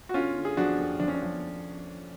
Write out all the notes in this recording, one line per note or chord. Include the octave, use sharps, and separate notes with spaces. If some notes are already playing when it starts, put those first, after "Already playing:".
F#4
D3 C#4 F4
D3
G#4
F3 D4 F#4
F2
F3 D4
C#4
D4
F3